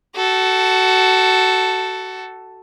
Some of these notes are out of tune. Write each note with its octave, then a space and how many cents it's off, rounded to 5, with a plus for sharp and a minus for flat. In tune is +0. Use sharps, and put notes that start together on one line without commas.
F#4 +20 A4 +0